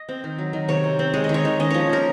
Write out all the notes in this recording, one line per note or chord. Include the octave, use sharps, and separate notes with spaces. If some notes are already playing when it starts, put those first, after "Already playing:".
Already playing: D#5
C4
D#3
F#3
D#3
C3 C#5
C4
C4
G#3 C#5
D#5
D#3
C#5
D#3
C#4 D#5
F3 C#5
A#3 A#4